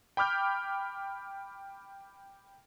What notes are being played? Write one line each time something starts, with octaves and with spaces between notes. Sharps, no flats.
G5 B5 D6 F6 G6